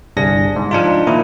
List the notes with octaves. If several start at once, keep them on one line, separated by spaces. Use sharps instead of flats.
G1 C2 D4 G#4 A#6
G#2
F3 D4 D#4 F4
A#2 D#3 E4